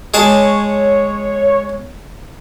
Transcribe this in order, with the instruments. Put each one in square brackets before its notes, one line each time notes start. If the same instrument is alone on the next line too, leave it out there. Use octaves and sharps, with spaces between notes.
[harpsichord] G#3 G#4 A5 [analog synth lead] C#5